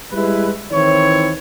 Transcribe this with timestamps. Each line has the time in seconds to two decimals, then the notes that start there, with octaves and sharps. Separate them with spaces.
0.13 G3 G#3 E4 B4
0.72 D#3 E3 C4 E4 C#5